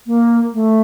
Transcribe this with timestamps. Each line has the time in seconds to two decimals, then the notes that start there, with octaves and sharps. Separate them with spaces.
0.07 A#3
0.53 A3